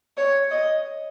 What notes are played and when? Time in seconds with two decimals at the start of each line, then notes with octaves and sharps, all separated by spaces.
0.17 C#5
0.51 D#5